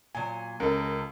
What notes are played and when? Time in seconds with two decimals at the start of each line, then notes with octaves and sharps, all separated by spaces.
0.15 A#2 F#3 G#5
0.60 C#2 C#4 A4 A#4